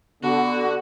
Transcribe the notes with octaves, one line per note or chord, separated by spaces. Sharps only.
D3 B3 F#4